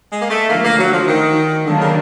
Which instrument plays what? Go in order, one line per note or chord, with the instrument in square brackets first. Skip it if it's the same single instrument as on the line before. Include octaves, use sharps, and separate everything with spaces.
[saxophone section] G#3
A#3
A3
[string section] D3 F3 A3 [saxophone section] A#3
[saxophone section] A#3
F#3
F3
D#3
[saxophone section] D3 [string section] D#3 F#3 A#3 D4
[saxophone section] C#3